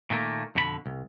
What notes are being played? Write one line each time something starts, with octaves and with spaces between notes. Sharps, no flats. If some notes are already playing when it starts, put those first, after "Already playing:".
A#2 D#3 A3 A#3
F2 B2 D3 G4 B5
C2